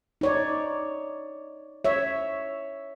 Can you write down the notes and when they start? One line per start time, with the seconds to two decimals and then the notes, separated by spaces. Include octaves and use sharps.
0.21 D#4 C#5 D5
1.84 C#5 E5